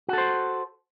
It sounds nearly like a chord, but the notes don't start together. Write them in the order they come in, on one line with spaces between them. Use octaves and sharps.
F#4 A4 C5